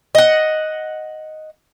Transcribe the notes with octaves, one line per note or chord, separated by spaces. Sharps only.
D#5 F#5